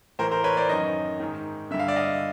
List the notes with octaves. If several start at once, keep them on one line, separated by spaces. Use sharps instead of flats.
A2 E3 A#4 C5
A#4 C5
B4 C#5
C5 D5
F#2 D#3 C#5 D#5
G#2 D#3
G2 D3 E5
F5
D5 E5
D#5 F5